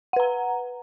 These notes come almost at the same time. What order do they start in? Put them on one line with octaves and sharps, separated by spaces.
F#5 B4 A#5